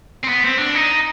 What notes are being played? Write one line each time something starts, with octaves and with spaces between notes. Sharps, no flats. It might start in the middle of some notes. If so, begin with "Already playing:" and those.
C4
B3
C4
D4
D#4